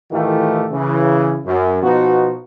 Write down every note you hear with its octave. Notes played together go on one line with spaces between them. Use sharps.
A2 D#3 E3 A3 F4 G4
C#3 E3
F#2
B2 F3 B3 D#4 F#4